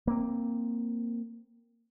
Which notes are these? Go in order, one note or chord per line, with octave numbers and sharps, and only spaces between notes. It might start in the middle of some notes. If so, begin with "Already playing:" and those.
A#3 C4